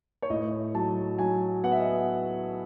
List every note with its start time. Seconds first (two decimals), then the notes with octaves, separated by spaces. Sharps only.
0.22 C#5
0.30 A2 D#5
0.74 F#3 A5
1.19 F#3 G#5
1.63 B3 F#5
1.72 E5
1.80 D#5